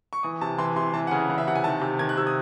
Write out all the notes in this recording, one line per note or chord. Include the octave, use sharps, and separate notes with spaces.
C#6
E3 D#6
C3 A5
E3 C6
C3 C6
E3 A5
F#5
C#3 G#5
E3 F#5
E5
C3 F#5
G#5
D#3 A5
C3
D#3 G#6
F#6
C3 E6
D#6